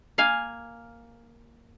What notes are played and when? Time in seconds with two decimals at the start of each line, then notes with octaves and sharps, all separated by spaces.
0.18 A#3 F5 G#5